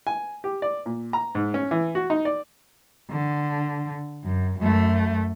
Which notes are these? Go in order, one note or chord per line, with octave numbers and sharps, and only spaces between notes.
G#5
G4
D5
A#2
A#5
G#2
C#4
E3
F#4
D#4
D5
D3
F#2
F#2 A3